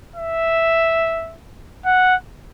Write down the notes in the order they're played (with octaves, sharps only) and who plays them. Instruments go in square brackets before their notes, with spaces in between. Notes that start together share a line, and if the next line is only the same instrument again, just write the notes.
[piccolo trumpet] E5
F#5